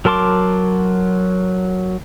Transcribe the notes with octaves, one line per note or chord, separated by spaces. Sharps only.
F#3 A#4 A5 C6 D6